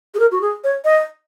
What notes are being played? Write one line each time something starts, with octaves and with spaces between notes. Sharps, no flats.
G#4
A#4
F#4
G#4
C#5
D#5